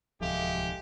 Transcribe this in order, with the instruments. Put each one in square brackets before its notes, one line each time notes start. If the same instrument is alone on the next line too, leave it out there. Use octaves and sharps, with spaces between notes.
[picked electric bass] D1 C2 F3 [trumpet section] G#3 G4 [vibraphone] A4 E5 F5